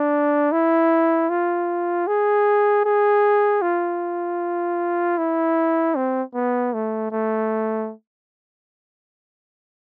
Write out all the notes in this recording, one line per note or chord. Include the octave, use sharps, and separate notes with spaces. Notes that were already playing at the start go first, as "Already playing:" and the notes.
Already playing: D4
E4
F4
G#4
G#4
F4
E4
C4
B3
A3
A3